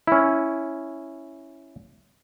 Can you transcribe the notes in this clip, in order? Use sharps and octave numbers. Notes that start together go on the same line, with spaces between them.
C#4 E4